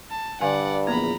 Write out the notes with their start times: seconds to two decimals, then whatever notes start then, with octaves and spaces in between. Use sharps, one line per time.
0.11 A5
0.41 G2 D3 D5 F5 F#5 G#5
0.87 A#1 E2 A#3 G#4 A#5 B5